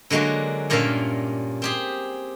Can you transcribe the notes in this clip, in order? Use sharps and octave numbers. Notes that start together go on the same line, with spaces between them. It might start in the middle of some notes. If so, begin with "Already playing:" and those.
D3 F#3 G#3 A#3 F#4
G2 A#2 A#3 C#4 E5 F5
C4 G4 G#4